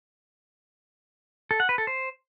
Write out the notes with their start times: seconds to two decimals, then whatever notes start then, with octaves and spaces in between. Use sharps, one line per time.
1.51 A4
1.60 F#5
1.69 B4
1.78 A4
1.87 C5